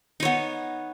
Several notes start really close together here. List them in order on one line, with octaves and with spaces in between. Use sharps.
D#4 C#5 B3